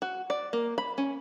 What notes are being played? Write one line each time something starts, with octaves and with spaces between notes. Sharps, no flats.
F#4
D5
A#3
B5
C#4